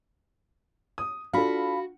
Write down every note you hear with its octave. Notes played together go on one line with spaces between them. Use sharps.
D#6
D4 F4 F#4 A4 F5 B5